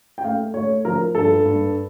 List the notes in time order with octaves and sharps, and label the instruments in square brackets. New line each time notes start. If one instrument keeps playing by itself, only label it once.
[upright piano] G5
A3 F5
A3 C#5
F3 A#4
G2 A4
G2